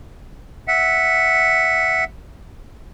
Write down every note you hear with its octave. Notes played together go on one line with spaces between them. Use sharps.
E5 F#5